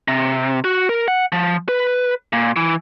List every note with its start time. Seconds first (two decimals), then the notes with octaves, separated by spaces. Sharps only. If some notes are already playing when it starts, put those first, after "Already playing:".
0.08 C3
0.64 F#4
0.89 A#4
1.08 F#5
1.32 F3
1.69 B4
2.33 A#2
2.56 E3